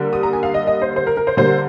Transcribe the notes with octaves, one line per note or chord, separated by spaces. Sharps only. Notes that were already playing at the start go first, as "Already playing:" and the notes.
Already playing: D3 G3 A#3
D#6
A#5
G#5
F5
D#5
D#5
C5
C5
A#4
A#4
C5
D3 G3 A#3 C5